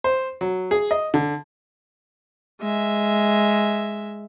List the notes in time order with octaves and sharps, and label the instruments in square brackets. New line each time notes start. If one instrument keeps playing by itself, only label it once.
[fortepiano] C5
F#3
G#4
D#5
D3
[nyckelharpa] G#3 E5